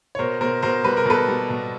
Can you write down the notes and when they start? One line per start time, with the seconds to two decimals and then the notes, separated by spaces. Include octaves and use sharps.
0.15 C#5
0.19 B2 A#4 C5
0.41 B2 A#4 C5
0.62 B2 A#4 C5
0.84 G3 B4
0.97 A#4
1.06 B2 A4 B4
1.28 G3
1.50 B2